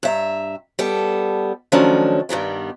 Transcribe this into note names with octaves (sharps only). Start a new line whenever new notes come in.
G2 E5 A#5
G3 B3 A4
D#3 F3 F#3 A3 C#4 D4
G2 D#3 G3 B3